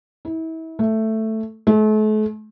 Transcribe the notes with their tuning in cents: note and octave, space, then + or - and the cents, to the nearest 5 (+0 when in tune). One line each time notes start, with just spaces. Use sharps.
E4 -35
A3 +5
A3 -40